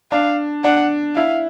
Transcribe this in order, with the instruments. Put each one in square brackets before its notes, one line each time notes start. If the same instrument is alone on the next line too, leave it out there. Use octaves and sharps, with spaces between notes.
[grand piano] D4 [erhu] F5
[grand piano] D4 [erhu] F#5
[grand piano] E4 [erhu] F5